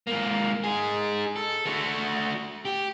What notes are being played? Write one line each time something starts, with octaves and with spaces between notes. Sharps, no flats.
G#2 A#3
D#4 G#4
A4
A3 F#4
G4